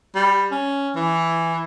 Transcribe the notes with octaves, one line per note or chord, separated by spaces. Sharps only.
G3
C#4
E3